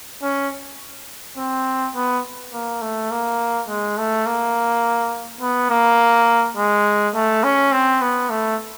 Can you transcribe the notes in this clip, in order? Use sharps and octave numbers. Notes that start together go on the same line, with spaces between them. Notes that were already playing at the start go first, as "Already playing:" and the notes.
C#4
C4
B3
A#3
A3
A#3
G#3
A3
A#3
B3
A#3
G#3
A3
C#4
C4
B3
A3